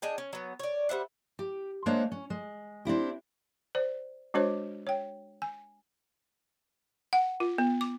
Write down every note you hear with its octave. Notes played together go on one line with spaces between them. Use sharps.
D4 G#4 D#5 G5
C#4
F#3 B3
C#5 D5
G3 C5 E5 F#5
G4
G#3 A#3 D4 C5 C#5
C#4
G#3
C4 D4 E4 G4
C5 D5
G#3 D4 F#4 C5 C#5 D6
C#5 G5
G#5
F#5
F4
B3
D6